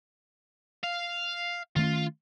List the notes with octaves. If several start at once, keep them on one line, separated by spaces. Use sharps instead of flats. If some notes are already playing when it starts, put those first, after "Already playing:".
F5
D#3 A3 C#4 F4